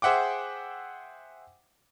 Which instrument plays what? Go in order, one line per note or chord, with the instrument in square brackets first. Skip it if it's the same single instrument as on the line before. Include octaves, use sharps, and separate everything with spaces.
[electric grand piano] G#4 C5 E5 F#5 G5 D6